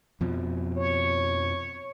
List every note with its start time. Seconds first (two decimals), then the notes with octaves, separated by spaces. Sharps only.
0.21 F2 B2 F3
0.77 C#5